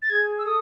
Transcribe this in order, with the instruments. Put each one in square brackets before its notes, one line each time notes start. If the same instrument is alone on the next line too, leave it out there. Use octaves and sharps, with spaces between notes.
[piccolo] A6
[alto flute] G#4 [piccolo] G#6
[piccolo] E6
[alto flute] A4 [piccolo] D#6